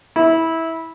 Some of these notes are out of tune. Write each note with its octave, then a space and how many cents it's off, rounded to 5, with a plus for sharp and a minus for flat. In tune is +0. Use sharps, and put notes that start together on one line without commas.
E4 -15